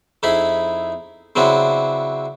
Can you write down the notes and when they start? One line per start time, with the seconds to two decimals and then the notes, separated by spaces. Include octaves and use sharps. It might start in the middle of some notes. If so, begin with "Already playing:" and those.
0.23 F2 D#4 E4 G#4 B5
1.36 C#3 F#3 C4 D4 E4